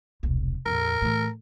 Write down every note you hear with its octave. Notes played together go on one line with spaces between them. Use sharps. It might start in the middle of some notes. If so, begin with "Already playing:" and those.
E1 C2
A#1 F2 A#4
A2 E3